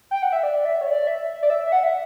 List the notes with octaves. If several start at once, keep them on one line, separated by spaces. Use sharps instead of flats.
G5
F#5
E5
D5
E5
C#5
D5
E5
D5
E5
F#5
E5